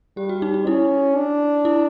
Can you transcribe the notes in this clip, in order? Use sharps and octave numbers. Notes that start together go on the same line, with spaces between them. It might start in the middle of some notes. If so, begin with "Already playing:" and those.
G3 G4
F#4
D#4
D#4
C#4 E4
D4
E4